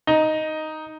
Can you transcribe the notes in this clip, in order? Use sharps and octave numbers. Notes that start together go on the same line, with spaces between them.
D#4